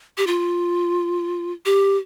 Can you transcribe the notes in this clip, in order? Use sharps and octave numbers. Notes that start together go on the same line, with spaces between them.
G4
F4
G4